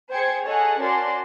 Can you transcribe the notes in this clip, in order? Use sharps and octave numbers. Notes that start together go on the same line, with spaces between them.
G#4 C5 G5 G#6 C#7
G#4 A4 C#5 D#5 F#5 A5
C#4 F#4 A#4 D5 A5 C6